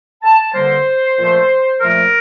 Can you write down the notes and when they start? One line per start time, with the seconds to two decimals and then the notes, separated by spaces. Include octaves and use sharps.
0.23 A5
0.53 G2 D3 G3 A#3 C5
1.17 A#2 F3 A3
1.80 A#2 F3 A3 A#4